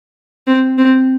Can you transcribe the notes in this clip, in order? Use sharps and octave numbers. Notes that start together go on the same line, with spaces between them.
C4
C4